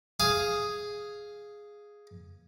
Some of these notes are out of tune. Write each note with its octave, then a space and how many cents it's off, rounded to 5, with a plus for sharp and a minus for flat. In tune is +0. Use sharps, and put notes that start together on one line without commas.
G#4 +0 F5 +0